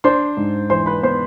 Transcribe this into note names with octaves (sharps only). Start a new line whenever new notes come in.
D4 C5 C6
G#2
E3 C5 C6
B4 B5
B3 C5 C6